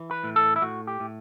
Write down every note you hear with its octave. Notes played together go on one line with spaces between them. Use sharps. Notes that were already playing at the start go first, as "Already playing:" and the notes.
Already playing: E3
B4
A2
A4
E4
A2 F#4
G4
A2